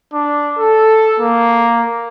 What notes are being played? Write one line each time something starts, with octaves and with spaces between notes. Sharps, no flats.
D4
A4
A#3